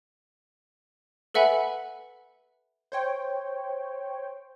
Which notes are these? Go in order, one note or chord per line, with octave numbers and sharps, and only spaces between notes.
A4 B4 E5 F#5 G#5 B5
C5 C#5 G5